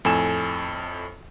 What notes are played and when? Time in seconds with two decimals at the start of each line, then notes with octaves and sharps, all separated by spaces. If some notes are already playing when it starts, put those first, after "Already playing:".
0.05 F2 A2 A4 G#5 E7